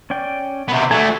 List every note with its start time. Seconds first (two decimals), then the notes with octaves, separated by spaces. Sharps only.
0.10 C#4 D5 G5
0.68 C3 B3
0.91 A3 F#4 G#5 E6